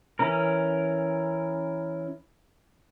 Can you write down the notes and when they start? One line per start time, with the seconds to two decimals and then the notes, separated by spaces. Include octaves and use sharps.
0.19 E3 C#4 A#4